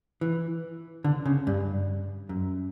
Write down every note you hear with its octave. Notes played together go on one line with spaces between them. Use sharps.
E3
D3
C#3
G2
F#2